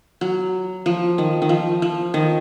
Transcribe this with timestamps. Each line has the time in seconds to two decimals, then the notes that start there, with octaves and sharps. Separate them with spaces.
0.21 F#3
0.86 F3
1.18 D#3
1.42 D#3
1.49 F3
1.82 F3
2.14 D#3